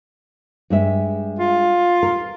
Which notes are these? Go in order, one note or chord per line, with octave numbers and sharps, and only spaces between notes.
G2 G#3 E5
F4
A#4